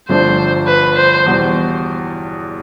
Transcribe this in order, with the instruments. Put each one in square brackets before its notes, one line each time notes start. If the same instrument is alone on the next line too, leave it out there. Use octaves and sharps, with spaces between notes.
[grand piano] G1 G2 F3 A3 D4 [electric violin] C5
[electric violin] B4
C5
[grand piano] E2 B2 G3